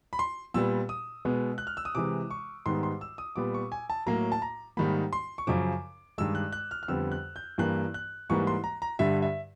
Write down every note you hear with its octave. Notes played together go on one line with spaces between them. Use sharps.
B5
C6
A#2 G3 B3 E6
D#6
B2 G#3 B3
F#6
F6
E6
D#6
C3 E3 G#3 D6
C#6
G#2 D#3 G3 B3 C6
C6
E6
D#6
A#2 G3 B3 D6
C#6
G#5
A5
A2 F#3 A#3 A#5
A5
A#5
G#2 D#3 G3 A#3 B5
C6
C#6
F#2 C#3 F3 D6
G2 D#3 G#3 E6
F#6
F#6
F6
F6
F2 D3 G3 B3 E6
F#6
G6
G2 E3 G3 A#3 F#6
F#6
G#2 E3 G3 A#3 C#6
C6
A#5
A#5
G2 D3 G3 E5
E5